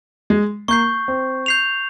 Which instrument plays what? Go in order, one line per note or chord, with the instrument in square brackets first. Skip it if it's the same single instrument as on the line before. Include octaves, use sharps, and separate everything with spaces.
[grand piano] G#3
[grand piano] A#3 [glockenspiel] C#6 G6 C7
[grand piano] C4
[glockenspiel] G6 C7 F7